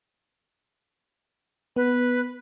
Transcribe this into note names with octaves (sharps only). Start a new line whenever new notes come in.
B3 B4